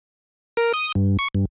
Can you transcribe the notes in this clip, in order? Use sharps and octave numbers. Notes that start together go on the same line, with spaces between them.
A#4
D#6
G2
C#6
G2